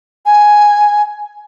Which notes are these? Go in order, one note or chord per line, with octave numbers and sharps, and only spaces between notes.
G#5